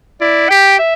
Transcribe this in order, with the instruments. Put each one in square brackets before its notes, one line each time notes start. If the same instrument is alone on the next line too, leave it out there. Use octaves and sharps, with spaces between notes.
[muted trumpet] E4 [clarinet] D5
[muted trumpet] G4 [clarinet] G5
[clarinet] E5